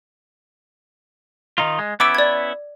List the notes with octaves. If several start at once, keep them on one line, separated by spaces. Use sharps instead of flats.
D#3 D#4 F4
G#3
B3 C#4 E4 D6 E6 D7
D5 G#6